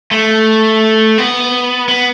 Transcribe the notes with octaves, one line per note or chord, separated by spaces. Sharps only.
A3
B3
B3